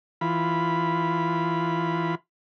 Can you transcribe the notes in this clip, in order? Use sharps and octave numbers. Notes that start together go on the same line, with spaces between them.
E3 F4 B5